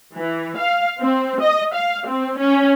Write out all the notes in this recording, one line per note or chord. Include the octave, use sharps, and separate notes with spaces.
E3
F5
C4
D#5
F5
C4
C#4